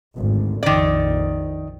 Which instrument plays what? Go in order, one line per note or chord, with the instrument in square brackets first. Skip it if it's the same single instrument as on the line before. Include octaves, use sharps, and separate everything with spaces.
[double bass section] G#1 D2
[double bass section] A#1 F2 [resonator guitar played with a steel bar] D#3 D5